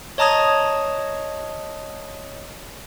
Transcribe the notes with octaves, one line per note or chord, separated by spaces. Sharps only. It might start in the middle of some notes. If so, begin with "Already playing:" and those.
C#5 D#5 A5 A#5 D#6 G#6